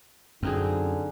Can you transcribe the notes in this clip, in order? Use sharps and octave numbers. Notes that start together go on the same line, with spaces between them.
F#2 D3 C4 D#4 G#4